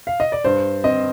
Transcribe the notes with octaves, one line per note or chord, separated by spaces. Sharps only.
F5
D#5
D5
G2 C5
C4 D#5